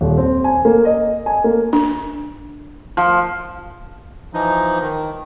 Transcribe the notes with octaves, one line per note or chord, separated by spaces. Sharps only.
D#1
C4
G#5
A#3
D#5
G#5
A#3
D4
F3
E3 F3 D#4
D#3